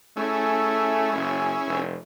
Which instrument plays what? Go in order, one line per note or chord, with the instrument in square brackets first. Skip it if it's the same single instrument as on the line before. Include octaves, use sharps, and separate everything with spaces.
[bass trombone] A3 [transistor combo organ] C#4 E4 G#4
[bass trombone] F#1
F1